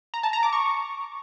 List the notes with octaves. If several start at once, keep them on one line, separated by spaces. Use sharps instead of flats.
A#5
A5
A#5
D6
C#6